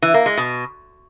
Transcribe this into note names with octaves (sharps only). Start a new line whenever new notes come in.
E3
A#3
G#3
B2